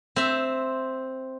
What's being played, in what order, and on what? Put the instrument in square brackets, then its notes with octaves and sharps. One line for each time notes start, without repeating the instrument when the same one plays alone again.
[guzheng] C4 E5